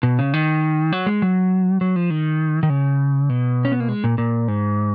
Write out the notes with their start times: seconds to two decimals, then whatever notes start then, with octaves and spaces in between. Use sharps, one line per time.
0.03 B2
0.19 C#3
0.34 D#3
0.92 F#3
1.06 G#3
1.22 F#3
1.81 F#3
1.96 F3
2.10 D#3
2.63 D#3
2.70 C#3
3.29 B2
3.65 C#4
3.72 B3
3.80 A#3
3.89 G#3
4.04 A#2
4.18 A#2
4.48 G#2